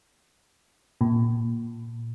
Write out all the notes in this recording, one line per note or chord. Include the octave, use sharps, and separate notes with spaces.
A#2